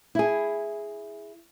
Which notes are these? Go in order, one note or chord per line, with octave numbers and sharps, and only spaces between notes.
E4 G#4